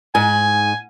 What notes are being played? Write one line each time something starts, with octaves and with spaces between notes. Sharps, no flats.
G#2 G#5